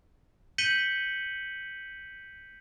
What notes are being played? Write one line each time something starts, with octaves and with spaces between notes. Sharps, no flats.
G6 B6 C#7 D#7 F#7 G7